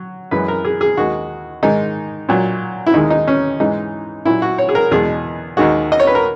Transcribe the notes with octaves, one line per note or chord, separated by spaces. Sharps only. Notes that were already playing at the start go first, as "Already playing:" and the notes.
Already playing: F#3
F#2 E3 G#3 B4
A#4
G#4
G#4
D#2 D#3 G#3 F#4
G#2 D#3 G#3 D#4
A#2 F#3
E4
D#2 D#3 G#3 D#4
D#4
C#4
G#2 E3 G#3 D#4
A#2 F#3 E4
F#4
C#5
G#4
A#4
E2 B2 G#3 G#4
D#2 D#3 G#3 F#4
D#5
C#5
B4
A#4